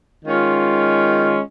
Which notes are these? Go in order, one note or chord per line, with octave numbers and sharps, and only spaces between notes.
D#3 G#3 C#4 F4